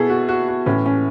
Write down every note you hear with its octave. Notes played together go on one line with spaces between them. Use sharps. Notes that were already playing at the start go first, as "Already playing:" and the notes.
Already playing: B2 E4 G#4 A4 B4
F#4
F#4
F#4
A2 E3 C#4
C#4